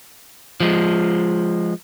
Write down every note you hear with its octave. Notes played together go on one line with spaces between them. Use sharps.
F3 G#3